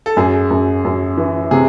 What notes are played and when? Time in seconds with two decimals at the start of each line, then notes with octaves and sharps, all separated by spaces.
0.06 A4
0.17 F#2 G#4
0.50 F#2
0.85 F#2
1.17 E3
1.51 C3 G#4